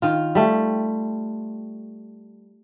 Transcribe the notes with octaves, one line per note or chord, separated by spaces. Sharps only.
D#3 F4
G3 A3